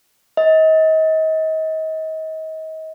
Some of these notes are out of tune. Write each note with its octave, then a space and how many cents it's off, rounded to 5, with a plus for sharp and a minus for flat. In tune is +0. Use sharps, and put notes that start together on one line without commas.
D#5 +35